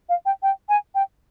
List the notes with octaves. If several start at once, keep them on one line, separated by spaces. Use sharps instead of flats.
F5
G5
G5
G#5
G5